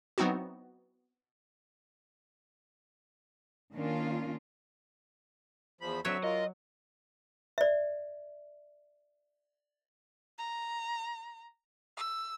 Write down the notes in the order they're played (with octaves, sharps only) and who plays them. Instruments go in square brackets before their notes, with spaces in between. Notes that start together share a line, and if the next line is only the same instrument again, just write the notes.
[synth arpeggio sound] F#3 B3 C4 D#4 E4 F#4
[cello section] D#3 A#3 C#4 D4 F4
[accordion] E2 F3 B5
[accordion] D3 C4 E5 [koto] F#3 F#4 C#5
[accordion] F4 A#4 [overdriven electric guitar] D#5
[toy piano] D5 E5
[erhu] A#5
E6